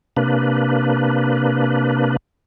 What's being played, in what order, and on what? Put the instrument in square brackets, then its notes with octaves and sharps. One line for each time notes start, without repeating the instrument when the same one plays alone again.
[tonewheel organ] C3 A#3 D4 B4